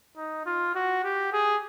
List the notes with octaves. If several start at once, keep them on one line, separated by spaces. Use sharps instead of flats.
D#4
F4
F#4
G4
G#4